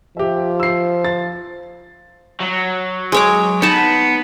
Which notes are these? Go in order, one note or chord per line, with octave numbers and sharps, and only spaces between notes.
F3 G4 E5
E6 C7
A6
F#3
G#3 C#5 D6
B3 D#4 A5